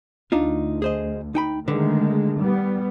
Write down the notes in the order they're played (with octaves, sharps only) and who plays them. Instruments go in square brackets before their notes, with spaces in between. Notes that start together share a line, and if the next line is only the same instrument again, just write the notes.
[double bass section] D2 [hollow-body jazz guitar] D4 D#4 F4
[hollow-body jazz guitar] G#4 C5 D#5
D#4 G5 B5
[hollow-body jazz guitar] D3 D4 B4 [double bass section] D#3 G#3 A3
[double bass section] G3 B3